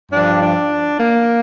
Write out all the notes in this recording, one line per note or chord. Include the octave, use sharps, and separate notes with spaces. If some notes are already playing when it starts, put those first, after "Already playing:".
G2 F3 D4
D4
A#3